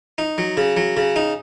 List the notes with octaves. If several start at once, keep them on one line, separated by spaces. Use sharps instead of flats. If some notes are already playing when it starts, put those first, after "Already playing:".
D#4
F#3
C#3
F#3
C#3
D#4